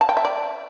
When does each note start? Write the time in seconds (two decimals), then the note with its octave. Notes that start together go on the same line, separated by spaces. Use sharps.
0.01 A5
0.09 G5
0.17 E5
0.25 D5